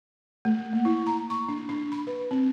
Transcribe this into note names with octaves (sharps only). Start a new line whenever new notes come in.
A3
A#3
E4
A#5
C#6
D4
D4
B5
B4
C4